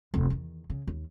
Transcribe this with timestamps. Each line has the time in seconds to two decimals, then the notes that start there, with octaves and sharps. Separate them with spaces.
0.14 F1 D#2
0.30 E2 D#3
0.70 C#3
0.87 D#2